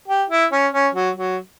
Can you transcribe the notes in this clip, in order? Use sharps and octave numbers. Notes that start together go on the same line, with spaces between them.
G4
E4
C#4
C#4
F#3
F#3